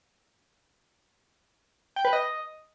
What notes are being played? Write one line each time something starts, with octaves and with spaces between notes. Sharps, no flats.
G5
B4
D#5